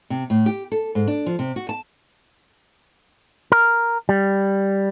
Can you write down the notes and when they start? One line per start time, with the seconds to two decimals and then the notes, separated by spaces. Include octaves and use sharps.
0.10 C3
0.30 A2
0.46 G4
0.72 A4
0.95 G#2
1.08 D4
1.26 F3
1.39 C3
1.56 F#4
1.69 A5
3.52 A#4
4.09 G3